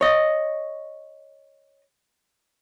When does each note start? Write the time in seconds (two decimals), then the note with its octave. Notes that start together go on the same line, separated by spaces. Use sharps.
0.01 C#5 D#5